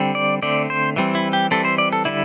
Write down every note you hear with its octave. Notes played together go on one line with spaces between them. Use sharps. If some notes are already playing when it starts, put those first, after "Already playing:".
Already playing: D3 G3 C4
D5
D3 A3 C4 D5
C5
E3 G3 C4
E4
G4
E3 G3 C4 A4
C5
D5
A4
D3 G3 E4